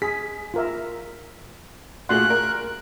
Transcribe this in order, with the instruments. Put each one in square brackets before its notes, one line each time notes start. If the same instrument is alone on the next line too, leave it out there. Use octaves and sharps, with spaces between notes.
[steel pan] G#4 [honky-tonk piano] B6
[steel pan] F4 A#4 E5
[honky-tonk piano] A#2 A3 F#4 [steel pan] G#4 C6 [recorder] F#6
[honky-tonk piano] A#4